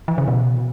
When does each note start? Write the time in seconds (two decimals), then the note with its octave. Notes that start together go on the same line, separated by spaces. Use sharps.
0.08 E3
0.18 C#3
0.28 B2